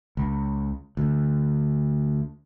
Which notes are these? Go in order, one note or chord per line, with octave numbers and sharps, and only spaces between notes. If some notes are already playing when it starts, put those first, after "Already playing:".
C#2
D2